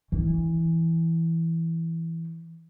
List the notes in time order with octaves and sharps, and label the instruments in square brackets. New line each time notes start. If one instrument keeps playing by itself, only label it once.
[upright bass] E3